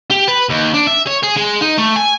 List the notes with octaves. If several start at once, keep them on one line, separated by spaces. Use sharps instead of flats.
G4
B4
D#2
D4
E5
C#5
G#4
G#3
D#4
A3
G#5